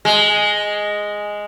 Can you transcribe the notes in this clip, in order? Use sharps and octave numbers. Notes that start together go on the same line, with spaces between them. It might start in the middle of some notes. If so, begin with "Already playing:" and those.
G#3